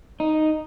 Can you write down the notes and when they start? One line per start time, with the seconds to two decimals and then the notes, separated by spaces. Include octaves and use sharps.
0.20 D#4